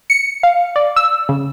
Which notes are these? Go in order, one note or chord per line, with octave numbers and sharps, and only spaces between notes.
C#7
F5
D5
E6
C#3